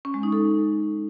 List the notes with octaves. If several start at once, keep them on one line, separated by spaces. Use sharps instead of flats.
C#4
G#3
D#4
A4